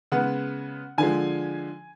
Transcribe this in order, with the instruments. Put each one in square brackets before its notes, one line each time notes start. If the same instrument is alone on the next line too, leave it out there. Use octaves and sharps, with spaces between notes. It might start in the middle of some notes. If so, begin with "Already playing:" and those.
[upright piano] C#3 G#3 B3 F#5
D3 F3 G#3 G#5